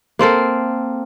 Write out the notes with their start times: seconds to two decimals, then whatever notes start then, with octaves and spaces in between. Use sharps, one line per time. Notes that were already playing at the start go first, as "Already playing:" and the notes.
0.19 A#3 C4 A4 A#4